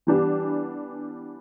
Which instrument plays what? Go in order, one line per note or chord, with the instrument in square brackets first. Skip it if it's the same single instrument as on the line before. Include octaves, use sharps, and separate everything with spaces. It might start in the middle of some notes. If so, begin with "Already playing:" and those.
[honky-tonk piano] E3 G3 B3 D4 G4